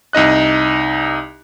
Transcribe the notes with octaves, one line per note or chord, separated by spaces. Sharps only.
C2 D#4 D#5 F#6